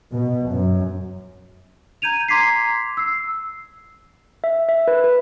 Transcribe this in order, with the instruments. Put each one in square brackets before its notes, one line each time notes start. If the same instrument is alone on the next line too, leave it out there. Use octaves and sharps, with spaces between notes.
[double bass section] B2
F#2
[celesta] A#5 G6 G#6 D#7 F7
A#5 C6 D6 G#6 B6 C7
E6 C7
[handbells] E5
E5
B4
B4